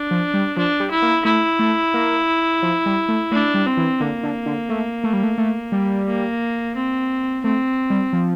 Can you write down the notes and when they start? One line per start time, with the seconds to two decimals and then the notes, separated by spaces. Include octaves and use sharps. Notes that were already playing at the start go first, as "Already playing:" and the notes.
Already playing: D4
0.11 F3
0.34 G3
0.57 F3 D4
0.80 G3
0.91 E4
1.02 A#3
1.25 A3 E4
1.59 A3
1.94 A#3
2.62 F3
2.86 G3
3.09 A3
3.32 A3 D4
3.54 G3
3.66 C4
3.77 E3
4.00 D3 A#3
4.23 D3
4.46 D3
4.69 A3
5.04 A3
5.13 G3
5.23 A3
5.38 A3
5.72 G3
6.07 A#3
6.75 C4
7.44 A3 C4
7.90 G3
8.13 F3